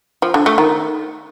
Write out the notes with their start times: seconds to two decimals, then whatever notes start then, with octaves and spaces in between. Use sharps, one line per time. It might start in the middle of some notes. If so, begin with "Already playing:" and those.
0.22 F3
0.34 D3
0.46 A3
0.58 D#3